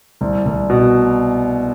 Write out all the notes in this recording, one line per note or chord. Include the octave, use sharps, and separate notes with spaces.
C2
C2
B2